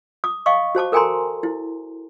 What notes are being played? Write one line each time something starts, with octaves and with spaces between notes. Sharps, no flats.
D6 D#6
D#5 F5 G5 C#6 D6
F#4 C5 A5 D6
A4 A#4 G5 G#5 A#5 C6
E4